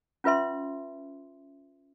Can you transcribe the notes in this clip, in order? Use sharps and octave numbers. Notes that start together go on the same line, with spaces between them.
C#4 F4 B4 E5 C6